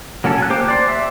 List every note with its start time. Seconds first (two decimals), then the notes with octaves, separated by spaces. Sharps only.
0.24 F#3 A#3 C#4 A4
0.38 G#5 F#6
0.50 A#3 G4 C5 D6
0.68 C5 D5
0.88 E5